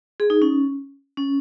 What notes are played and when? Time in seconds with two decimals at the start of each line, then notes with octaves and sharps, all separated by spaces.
0.20 G#4
0.30 D#4
0.42 C#4
1.17 C#4